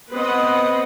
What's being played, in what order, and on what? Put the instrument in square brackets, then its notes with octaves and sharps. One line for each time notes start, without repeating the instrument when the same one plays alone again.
[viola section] B3 C4 B4 D#5 F#5